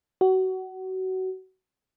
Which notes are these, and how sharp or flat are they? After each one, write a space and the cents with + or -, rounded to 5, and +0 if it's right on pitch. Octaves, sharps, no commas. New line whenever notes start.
F#4 +25